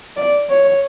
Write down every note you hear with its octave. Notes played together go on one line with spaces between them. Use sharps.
D5
C#5